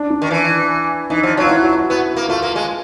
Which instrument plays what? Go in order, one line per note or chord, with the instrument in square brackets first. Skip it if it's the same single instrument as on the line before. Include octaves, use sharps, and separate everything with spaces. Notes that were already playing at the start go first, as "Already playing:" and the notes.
Already playing: [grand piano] D4
D4
[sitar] D#3
E3
[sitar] E3 [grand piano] D#4
[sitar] F3
[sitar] F#3 [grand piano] F4
[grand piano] E4
F#4
F#4
[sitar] B3
A#3
[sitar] A3 [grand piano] F4
[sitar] A#3
G#3